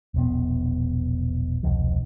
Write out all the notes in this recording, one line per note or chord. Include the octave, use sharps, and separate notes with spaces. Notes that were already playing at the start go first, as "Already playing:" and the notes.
E1 A#1 B3
E1 C2 D#3 F3